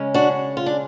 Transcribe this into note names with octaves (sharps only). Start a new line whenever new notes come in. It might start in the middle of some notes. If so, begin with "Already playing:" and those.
Already playing: C#3 G#3 C#4
D4 F#4
F4
D4